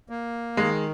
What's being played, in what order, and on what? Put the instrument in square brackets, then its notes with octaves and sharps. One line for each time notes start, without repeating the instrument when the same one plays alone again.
[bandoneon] A#3
[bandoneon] D#3 [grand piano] G#3